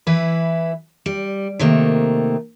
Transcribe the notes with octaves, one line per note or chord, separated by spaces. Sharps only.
E3 E4 B4
G3
C3 D#3 A3 A#3